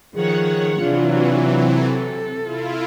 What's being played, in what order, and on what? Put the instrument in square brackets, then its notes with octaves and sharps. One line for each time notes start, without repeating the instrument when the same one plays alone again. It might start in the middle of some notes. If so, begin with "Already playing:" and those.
[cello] D#3 F3 [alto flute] G#4 [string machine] C#5 F#5
[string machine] C3 [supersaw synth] E3 F#3 [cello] D4 F4
[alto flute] C4
[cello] A4
[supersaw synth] E4 F4